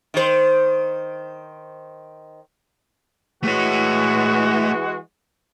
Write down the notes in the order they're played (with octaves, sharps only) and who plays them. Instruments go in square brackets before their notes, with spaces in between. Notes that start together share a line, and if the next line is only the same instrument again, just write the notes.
[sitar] D#3 C5
[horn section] E3 G#3 F#4 [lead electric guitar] A3 C#5